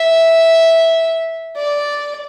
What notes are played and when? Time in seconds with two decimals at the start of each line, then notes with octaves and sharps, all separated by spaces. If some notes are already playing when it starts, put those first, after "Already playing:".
Already playing: E5
1.57 D5